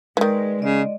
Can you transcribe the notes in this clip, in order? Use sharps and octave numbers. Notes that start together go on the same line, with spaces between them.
D#3 E3 G#3 B4 D5
C#3 D5 D#5